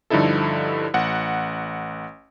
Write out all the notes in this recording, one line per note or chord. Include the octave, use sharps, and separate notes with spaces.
G2 D3 F3 D#4 E4 A4
A1 F#5